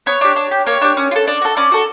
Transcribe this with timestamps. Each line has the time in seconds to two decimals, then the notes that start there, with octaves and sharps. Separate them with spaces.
0.06 B3 C#5
0.21 D4 G4
0.36 D4
0.51 G4
0.67 A#3 C#5
0.81 D4 G4
0.97 C#4
1.11 F4
1.16 A4
1.27 D4 D5
1.41 F#4 A4
1.57 C#4 D5
1.72 F#4 A4